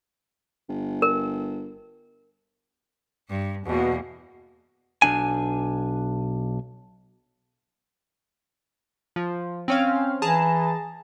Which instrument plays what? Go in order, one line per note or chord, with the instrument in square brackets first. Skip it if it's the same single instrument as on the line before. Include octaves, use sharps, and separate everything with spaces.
[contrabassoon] G1
[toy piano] A#4
[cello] G2
[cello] E2 A#3 [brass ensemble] B2
[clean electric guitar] B1 E3 D4 G#5
[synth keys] F3
C4 C#4 F5
[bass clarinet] E3 [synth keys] G#4 A5 A#5